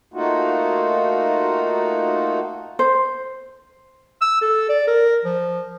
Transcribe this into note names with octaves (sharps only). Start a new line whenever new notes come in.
A3 A#3 D#4 F4 F#4
C5
E6
A4
D5
A#4
F3